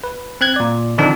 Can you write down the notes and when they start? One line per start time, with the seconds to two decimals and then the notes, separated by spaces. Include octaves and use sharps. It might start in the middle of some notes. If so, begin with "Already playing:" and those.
0.04 B4
0.41 C4 F#6 G#6
0.56 A#2 D5
0.98 D3 D#3 F3 C4 D4 D#4